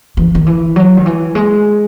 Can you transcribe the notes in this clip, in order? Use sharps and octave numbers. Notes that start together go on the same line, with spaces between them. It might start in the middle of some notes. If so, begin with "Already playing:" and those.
E3
D#3
E3
F#3
D#3
E3
G#3